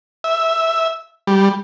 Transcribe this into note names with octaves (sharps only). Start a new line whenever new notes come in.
E5
G3